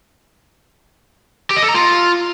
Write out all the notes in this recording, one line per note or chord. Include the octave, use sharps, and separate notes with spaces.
G4
D#5
A4
A#5
F4